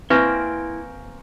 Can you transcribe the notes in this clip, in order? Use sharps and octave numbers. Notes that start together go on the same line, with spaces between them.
A#3 C4 E4 B4 G#5 C#6 A#6